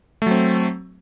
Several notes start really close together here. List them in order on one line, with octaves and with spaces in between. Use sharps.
A3 F#3 C4